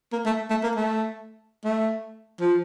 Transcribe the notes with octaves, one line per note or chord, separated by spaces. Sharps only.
A#3
A3
A3
A#3
A3
A3
F3